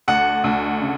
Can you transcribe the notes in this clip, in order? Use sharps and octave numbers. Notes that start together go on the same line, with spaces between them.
D2 F#5
D2
C#3